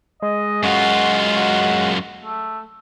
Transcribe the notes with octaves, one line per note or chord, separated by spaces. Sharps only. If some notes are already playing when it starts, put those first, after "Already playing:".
G#3 D#5
F#2 F4 F#4
F#4
A3